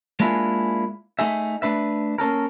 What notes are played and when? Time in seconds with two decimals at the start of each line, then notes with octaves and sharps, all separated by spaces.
0.20 G#3 A#3 D4 E4 F4 G#4
1.19 A3 D#4 G#4 E5
1.62 A3 D4 B4 E5
2.18 A#3 C#4 A4 A#4